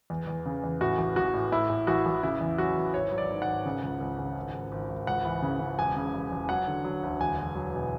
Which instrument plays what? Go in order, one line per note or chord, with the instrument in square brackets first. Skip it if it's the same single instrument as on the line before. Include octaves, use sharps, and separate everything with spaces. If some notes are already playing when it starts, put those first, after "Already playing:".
[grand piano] E2
E2
C#3
E2
A2 F#4
A1
A1 F#4
A2
A2 E4
A2
A1 F#4
A1
C#3 E4
E2
F#3 F#4
E2
G#1 C#5
F#3
D5
G#2
F#5
G#1
C#3
C#2
C#2
C#3
G#1
G#1
G#1
G#1
C#2 F#5
E3
C#3
C#3
E1 G#5
C#3
E1
E1
F#3 F#5
D3
F#3
D2
E1 G#5
E2
F#3
B2